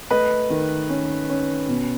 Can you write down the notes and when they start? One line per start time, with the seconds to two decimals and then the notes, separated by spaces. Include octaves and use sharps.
0.10 A3 B4 D#5
0.50 D#3
0.89 C#4
1.30 C#4
1.68 B2